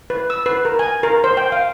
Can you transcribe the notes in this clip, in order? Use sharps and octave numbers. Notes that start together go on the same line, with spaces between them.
B4
E6
B4
A#4
G#5
A#4
C5
G5
F5